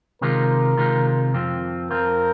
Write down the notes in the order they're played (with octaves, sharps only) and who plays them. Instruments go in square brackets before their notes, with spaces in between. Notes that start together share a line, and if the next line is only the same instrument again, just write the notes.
[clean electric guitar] C3 D#3 G#3 F4 [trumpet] A#4
[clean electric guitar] C3 D#3 G#3 F4
F2 F3 C4 F4
[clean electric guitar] F2 F3 C4 F4 [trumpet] A#4